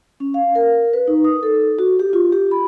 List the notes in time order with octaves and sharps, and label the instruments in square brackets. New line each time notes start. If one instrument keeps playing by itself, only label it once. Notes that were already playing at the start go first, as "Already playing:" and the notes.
[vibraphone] C#4
F5
A#4
B4
D#4
D#6
A4
F#4
G4
F4
G4
B5